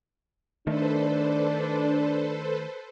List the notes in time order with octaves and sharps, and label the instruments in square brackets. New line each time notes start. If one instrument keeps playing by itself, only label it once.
[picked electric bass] D#3 A3 [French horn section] D4 [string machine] A4 B4 C5